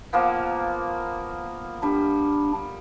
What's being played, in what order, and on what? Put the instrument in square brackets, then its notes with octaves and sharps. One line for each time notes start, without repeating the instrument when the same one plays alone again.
[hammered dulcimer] F3 A#3 B3
[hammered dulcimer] G3 [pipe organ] D4